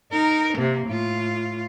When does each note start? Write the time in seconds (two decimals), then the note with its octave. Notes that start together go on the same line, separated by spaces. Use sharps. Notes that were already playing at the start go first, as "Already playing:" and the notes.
0.12 D#4 A#4
0.57 C3 A#3
0.87 A2 F4